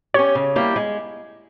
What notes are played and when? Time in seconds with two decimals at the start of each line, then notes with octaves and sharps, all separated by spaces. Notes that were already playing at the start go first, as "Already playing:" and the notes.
0.14 C#4 G4 C#5
0.35 C#3
0.56 G3 A#3 E4 G4
0.76 G#3